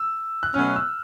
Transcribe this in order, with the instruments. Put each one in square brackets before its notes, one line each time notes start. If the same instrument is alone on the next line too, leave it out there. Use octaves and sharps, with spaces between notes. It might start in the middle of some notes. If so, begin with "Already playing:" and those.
Already playing: [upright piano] E6
F#6
[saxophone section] B2 F#3 A3 C#4 [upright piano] F6
[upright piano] E6